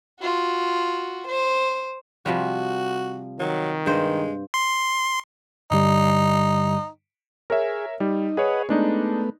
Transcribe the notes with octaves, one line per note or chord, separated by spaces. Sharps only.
F4 F#4
C5
C3 F3 G3 F#4
D#3 F#3
G2 G#3 C5
C6
G2 D3 G3 D#4
G#4 A#4 C#5 E5
G3 D#4
G#4 B4 C#5 D#5 F#5
G#3 A3 B3 D4 D#4